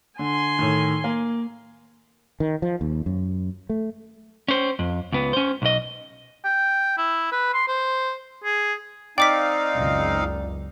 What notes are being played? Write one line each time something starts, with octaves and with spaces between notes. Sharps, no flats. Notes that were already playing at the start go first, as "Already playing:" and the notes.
D3 G#5 C6
A2 D#3
A#3
D#3
F3
D#2
F#2
A3
C#4 C5
F2
C#2 B3
C#4 C5
B1 D#5
G5
E4
B4
C6
C5
G#4
C4 D#4 D5 F5 G5 D6 B6
F#1 C#2